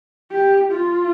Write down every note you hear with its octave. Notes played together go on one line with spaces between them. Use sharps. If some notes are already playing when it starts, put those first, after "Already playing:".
G4
F4